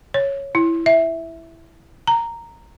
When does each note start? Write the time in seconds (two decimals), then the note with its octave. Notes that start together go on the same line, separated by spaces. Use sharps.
0.14 C#5
0.55 E4
0.86 E5
2.07 A#5